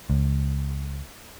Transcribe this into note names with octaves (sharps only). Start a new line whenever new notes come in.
C#2